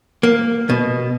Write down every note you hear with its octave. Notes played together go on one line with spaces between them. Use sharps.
A#3
B2